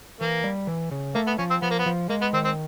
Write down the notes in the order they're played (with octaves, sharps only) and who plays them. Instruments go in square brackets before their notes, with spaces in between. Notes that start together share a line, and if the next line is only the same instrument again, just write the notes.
[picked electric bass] E3 [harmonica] A#3
[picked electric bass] G3
E3
C#3
[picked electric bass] A3 [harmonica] A#3
[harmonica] B3
[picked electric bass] F3 [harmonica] C#4
[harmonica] C4
[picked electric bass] F3 [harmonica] B3
[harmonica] A#3
B3
[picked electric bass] F3
[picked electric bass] G#3 [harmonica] A#3
[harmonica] B3
[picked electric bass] D#3 [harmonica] C4
[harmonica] C4